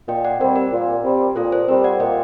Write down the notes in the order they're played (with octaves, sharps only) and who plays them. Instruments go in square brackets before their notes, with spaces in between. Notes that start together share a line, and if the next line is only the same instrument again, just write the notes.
[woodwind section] A#2 [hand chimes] D#5 G5
[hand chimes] D5 F#5
[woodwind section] G3 C4 [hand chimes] A#4 D5
[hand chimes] A#4 D5
[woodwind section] A#2
G3 C4
[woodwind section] A#2 [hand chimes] A4 C5
[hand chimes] A4 C5
[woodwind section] G3 C4 [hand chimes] A#4
[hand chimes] D5 F#5
[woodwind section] A#2 [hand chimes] D#5 G5